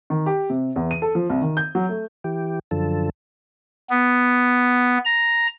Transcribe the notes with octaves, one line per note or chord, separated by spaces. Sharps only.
D#3
G4
C3
E2
D#7
A4
F3
C2
D#3
G6
F#3
A3
E3 G4
F#2 D3 F3 A4
B3
A#5